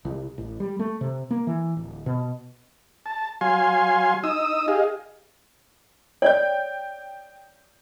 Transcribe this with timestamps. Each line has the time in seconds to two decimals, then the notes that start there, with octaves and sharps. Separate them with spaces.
0.05 C2
0.38 A1
0.60 G3
0.79 A3
1.01 C3
1.31 A#3
1.47 E3
1.77 D1
2.06 B2
3.06 A5
3.41 F#3 F5 G#5 C6
4.24 D#4 D#6 E6
4.68 G4 G#4 D#5 F5
6.22 C#5 D5 G5 G6